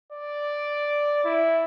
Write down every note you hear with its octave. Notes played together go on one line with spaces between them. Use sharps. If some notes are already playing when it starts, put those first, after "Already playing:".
D5
E4